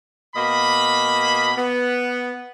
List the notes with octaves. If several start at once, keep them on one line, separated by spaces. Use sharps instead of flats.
B2 A#3 D#5 B5
B3